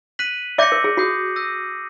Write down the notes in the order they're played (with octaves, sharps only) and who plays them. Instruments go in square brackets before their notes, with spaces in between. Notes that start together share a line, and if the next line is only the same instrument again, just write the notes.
[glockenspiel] F#6 B6 D#7 F#7
[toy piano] D5 E5 [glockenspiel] D6 G6 A#6 C#7
[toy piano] A#4
G#4
[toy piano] F#4 [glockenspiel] D#6 G6 C7
[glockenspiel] E6 G6 A#6 D#7